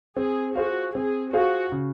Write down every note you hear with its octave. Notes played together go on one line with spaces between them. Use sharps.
C4 G#4
F4 F#4 G#4 C5 F5
C4 G#4
F4 F#4 G#4 C5 F5
C#3